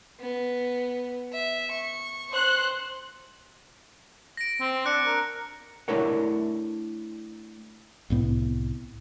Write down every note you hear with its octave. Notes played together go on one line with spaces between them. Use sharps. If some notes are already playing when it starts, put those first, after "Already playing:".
B3
E5
C#6
C5 F#6
A#6 D7
C4
D4 F#6 C#7
A#4
A3 D4 E4 A#4 C#5 F#5
C2 A2 B3